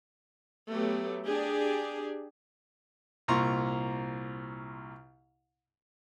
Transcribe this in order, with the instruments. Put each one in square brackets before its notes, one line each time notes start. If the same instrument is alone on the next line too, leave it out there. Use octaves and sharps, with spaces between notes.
[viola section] F#3 A3 B3 G4
D4 G4 G#4
[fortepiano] C2 A#2 A#5 C6 C#6